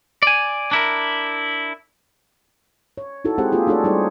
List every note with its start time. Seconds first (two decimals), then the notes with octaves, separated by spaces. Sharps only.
0.23 D5 G#5
0.71 D4 E4 A#4
2.98 C#5
3.25 D#4 E4 F#4 A4
3.38 G#3 C4 G4 G#4 C5 F#5
3.52 A#3 C4 F4 G4 G#4
3.67 A3 D4 F#4 G#4 A4 C#5
3.84 G3 D#4 G#4 C5 C#5